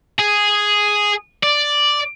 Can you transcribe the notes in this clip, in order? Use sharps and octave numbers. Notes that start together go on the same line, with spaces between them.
G#4
D5